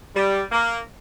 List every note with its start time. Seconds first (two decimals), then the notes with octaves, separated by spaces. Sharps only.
0.15 G3
0.52 A#3